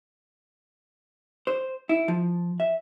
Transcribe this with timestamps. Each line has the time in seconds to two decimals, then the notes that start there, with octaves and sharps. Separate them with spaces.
1.47 C5
1.89 E4
2.08 F3
2.60 E5